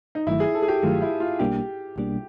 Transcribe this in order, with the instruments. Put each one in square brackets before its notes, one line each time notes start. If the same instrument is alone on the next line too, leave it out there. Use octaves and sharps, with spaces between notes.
[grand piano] D#4
[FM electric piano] G1 G2 D#3 F#3 A3 [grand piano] E4
[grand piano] G#4
A4
G#4
G4
[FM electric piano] G1 G2 D#3 F#3 A3 [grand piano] F4
[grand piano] E4
F4
[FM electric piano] B1 B2 G3 A#3 D4 [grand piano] G4
[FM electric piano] B1 B2 G3 A#3 D4